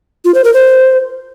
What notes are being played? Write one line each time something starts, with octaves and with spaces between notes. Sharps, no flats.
F4
C5
A#4
C5